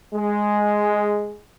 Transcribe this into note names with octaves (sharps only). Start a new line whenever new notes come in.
G#3